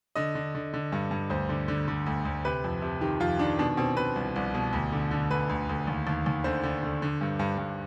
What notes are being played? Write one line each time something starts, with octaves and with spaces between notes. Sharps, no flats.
D3 D#5
D3
D3
D3
G2
G2
D2 C5
D3
D3
D3
D2
D2
C3 B4
F2
C3
D#3 G4
F2 F4
D#3 D4
B2 D4
B2 C4
B2 B4
C2
C2
B2
D2
D3
D3
D2 B4
D2
D2
D#2
D#2
D#2
D3 C5
D3
D3
D3
G2
G2
G2